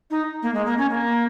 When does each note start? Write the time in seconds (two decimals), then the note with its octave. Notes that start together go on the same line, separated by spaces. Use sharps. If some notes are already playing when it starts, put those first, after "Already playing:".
0.10 D#4
0.42 A#3
0.54 G#3
0.66 A#3
0.78 C#4
0.90 A#3